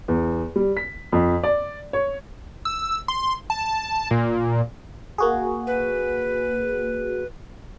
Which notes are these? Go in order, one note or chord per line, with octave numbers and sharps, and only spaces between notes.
E2
G3
B6
F2
D5
C#5
E6
C6
A5
A#2
A#3 F#4 G#4
B4